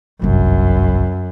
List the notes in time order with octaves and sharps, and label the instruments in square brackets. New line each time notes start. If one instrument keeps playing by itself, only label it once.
[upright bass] G1 C2 [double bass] F#2